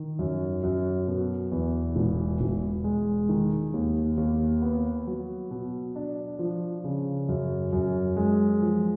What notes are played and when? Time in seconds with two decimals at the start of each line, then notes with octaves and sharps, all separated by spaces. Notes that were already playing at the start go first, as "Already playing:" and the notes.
Already playing: D#3
0.19 F#2
0.63 F#2
1.07 B2
1.52 E2
1.96 E1
2.41 E1
2.84 G#3
3.29 D#3
3.74 D#2
4.17 D#2
4.62 B3
5.07 F#3
5.51 B2
5.96 D4
6.39 F3
6.84 C#3
7.29 F#2
7.73 F#2
8.17 G#3
8.61 F3